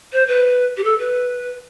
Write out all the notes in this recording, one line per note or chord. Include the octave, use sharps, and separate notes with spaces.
C5
B4
G4
A4
B4